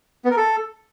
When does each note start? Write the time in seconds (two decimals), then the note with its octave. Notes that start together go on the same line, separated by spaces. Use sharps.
0.25 B3
0.31 A#4
0.37 A4